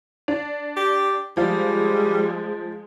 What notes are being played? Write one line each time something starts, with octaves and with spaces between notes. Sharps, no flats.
D4
G4
F3 G3 G#3 F5